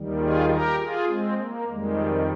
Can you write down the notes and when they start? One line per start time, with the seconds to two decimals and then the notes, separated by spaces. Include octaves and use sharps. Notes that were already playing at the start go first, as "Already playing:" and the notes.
Already playing: D#2 D#3 G3
0.19 F4 G#4
0.49 G4 A#4
0.78 F4 G#4
1.07 G#3 C4
1.38 A#3
1.66 F2 D#3 G3 G#3